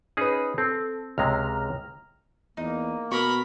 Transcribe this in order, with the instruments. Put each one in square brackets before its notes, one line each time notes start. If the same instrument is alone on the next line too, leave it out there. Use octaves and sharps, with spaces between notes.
[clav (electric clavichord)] C#4 D#4 G#4 [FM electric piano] B4 D#6
[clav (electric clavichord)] C4 [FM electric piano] A4
[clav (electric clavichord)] C#2 C3 G#3 [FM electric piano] A#5 F6
[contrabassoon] E2 [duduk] A#3 [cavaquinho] D#4
[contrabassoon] B2 [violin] A#4 B5 [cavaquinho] C#6